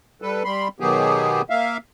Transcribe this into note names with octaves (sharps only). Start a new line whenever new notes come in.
G3 A4 B4
G3 B5 C6
B2 D#3 F#3 B3 G4 G#4
A#3 E5 F5